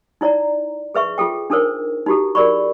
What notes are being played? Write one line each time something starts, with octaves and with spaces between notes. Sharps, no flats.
D#4 E4 C#5 D5 A#5
G#4 B4 E5 C#6
F4 G#4 A4 G5
D4 D#4 A4 A#4 C5 C#5
D#4 E4 F#4 G4 A4
F#4 G#4 A#4 D5 B5 C#6